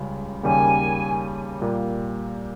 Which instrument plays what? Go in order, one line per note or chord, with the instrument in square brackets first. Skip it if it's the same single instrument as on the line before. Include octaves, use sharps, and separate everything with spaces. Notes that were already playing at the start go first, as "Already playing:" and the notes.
Already playing: [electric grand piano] C#2 C#3 G3
[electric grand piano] D#2 C#3 G3 A#3 [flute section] G#5
[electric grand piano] A#2 G3 A#3